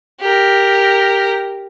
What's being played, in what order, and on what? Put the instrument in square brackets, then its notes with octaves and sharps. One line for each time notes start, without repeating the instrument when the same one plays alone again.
[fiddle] G4 A#4